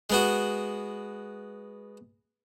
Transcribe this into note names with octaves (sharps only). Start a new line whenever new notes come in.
G#3 B3 F#4